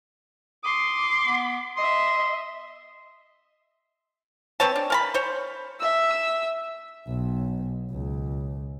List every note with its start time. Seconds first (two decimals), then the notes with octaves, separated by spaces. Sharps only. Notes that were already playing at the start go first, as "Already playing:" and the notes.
0.64 C6 D6 D#6
1.26 B3
1.77 D#5 E5 C6
4.60 C4 B4 C#5 A5
4.76 D4
4.90 A#4 A5 B5
5.14 C5 C#5
5.80 E5 E6
7.07 B1
7.92 C#2